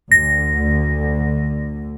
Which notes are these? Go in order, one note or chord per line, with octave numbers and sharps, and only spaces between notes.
D2 D3 A#6